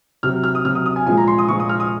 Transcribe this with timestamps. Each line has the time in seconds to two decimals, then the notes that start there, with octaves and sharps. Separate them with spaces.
0.23 C3 F#3 F6
0.44 F6
0.55 D#6
0.65 C3 F#3 F6
0.75 D#6
0.86 D#6
0.96 G#5
1.06 A#2 F3 G#3 G#5
1.17 A#5
1.28 C6
1.38 D#6
1.48 A#2 F3 G#3 C#6
1.60 D#6
1.69 F6
1.80 D#6